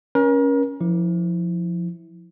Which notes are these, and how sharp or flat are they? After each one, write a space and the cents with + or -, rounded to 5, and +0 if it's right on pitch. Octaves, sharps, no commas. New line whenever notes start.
C#4 +0 A#4 +35
F3 +0 E4 -15